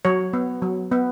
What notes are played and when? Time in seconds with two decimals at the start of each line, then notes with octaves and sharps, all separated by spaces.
0.05 F#3 C#5
0.33 B3
0.62 F#3
0.92 B3